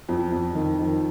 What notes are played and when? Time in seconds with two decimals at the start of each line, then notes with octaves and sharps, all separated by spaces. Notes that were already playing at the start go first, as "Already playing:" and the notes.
0.09 F2
0.32 F2
0.55 D#3
0.79 D#3